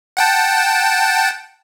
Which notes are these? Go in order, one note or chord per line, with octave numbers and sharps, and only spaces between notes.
F#5 G5 A5